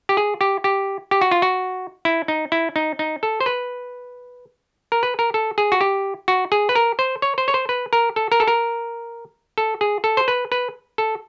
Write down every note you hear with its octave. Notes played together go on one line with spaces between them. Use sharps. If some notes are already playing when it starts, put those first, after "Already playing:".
G4
G#4
G4
G4
G4
F#4
F4
F#4
E4
D#4
E4
D#4
D#4
A4
C5
B4
A#4
B4
A#4
A4
G#4
F#4
G4
F#4
G#4
B4
A#4
C5
C#5
C5
C#5
C5
B4
A#4
A4
A#4
A4
A#4
A4
G#4
A4
C5
B4
B4
A4